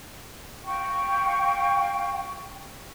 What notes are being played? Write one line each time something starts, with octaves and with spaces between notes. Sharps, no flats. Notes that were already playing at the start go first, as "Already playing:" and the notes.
F5 G5 C#6